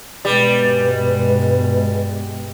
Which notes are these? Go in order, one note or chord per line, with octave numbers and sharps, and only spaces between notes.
G2 B2 G3 G#3 B4